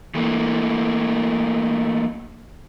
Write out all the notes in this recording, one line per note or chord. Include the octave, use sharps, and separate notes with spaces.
E3 A3 A#3